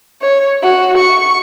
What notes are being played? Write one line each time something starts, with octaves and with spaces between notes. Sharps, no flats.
C#5
F#4
C#6